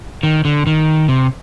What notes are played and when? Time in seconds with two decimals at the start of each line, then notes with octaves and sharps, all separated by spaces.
0.23 D#3
0.45 D3
0.67 D#3
1.08 C3